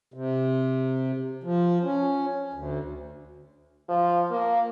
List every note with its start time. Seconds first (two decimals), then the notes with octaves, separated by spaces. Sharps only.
0.14 C3
1.44 F3
1.83 C#4
2.54 D2
3.89 F3
4.31 A#3